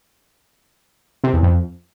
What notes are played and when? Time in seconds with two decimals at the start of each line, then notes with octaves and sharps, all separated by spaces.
1.24 C3
1.33 E2
1.43 F2